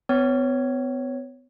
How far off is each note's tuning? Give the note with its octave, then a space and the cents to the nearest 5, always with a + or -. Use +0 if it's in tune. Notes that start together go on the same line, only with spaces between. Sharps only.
B3 +40 C#5 +0